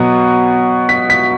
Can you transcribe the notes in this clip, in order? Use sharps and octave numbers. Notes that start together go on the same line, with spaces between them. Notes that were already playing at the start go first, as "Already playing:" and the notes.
Already playing: B2 F#3 B3
B6
B6